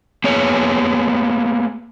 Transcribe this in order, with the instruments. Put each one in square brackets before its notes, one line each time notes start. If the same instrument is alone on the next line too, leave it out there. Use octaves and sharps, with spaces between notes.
[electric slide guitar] A#3 B3 G#4 C#5